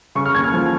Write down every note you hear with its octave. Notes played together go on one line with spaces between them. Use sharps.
C#3 C#6
F6
D#2 G#6
F6
F3